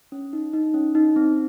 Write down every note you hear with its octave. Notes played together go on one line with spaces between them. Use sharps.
C#4
D#4
D#4
C#4
D#4
C4